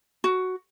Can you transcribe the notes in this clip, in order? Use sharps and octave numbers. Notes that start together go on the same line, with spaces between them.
F#4